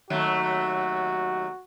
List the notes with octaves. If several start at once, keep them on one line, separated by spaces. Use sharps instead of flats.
D#2 F#3 A3 F#4